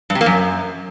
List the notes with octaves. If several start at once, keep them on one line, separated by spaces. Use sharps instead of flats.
G2
C3
A#3
F#2